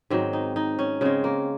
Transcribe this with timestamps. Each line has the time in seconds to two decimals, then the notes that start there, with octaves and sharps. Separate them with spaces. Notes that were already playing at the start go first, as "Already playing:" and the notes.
0.10 G#2 D#3 F#3 C4
0.33 D#4
0.56 D#4
0.79 C#4
1.01 C#3 G#3 C4
1.24 A#3